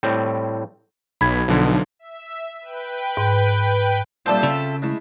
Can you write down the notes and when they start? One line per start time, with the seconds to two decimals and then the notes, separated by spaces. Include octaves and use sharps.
0.03 A2 G3 C4
1.21 B1 B5 G#6
1.48 B1 D3 F3
1.99 E5
2.61 B4 G5
3.17 G#2
4.26 G2 A#2 F3 C4 A4 E5
4.43 C#3 F4
4.82 G#3 A3 E4